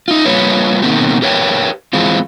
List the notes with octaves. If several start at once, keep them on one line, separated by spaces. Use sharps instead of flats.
D#4 F4
G3 A#3 F4 B4 C#5
B2 D#3 A#3 C4 G4
G4 A#4 B4 C#5 E5 G5
F2 E3 G#3 C4 F4